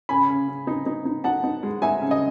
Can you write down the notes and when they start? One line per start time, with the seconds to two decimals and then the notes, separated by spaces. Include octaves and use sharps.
0.09 C#3 G#5 B5
0.29 C#3
0.48 C#3
0.67 D#4
0.86 D#4
1.05 D#4
1.24 D#4 F#5 A5
1.44 D#4
1.63 G#3
1.82 D#4 E5 G#5
2.01 C#3
2.11 D#5